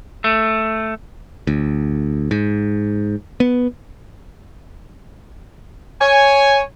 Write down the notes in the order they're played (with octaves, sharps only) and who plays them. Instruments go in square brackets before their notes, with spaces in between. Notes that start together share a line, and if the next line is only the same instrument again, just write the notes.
[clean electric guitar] A3
[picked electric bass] D2
G#2
B3
[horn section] C#5 G#5